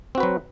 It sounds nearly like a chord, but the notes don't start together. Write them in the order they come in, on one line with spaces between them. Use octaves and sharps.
C4 F#4 B4 F#3